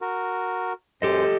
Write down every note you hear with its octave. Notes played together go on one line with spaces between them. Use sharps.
F#4 A#4
F#2 G4 A4 C5 D#5